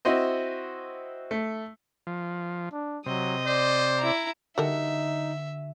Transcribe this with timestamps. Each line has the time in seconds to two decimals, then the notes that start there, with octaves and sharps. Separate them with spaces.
0.05 C4 E4 F#4 C5 D#5
1.31 A3
2.07 F3
2.72 D4
3.06 C3 F#3 D#5
3.47 C5 D5
3.98 E4 A#5
4.58 D3 G3 D#4 F#4 A4 A#4 E5